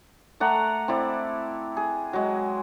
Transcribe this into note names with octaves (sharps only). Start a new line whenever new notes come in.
A3 D5 F#5 A#5
C4 E4 D5
G#4
F#3 G#3